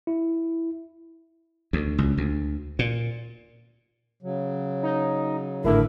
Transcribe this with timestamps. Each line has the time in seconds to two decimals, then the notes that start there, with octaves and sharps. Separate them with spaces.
0.07 E4
1.73 D2
1.98 C#2
2.17 D2
2.79 A#2
4.23 C#3 F#3
4.83 D#4
5.64 G#1 A2 D3 E4 A#4 B4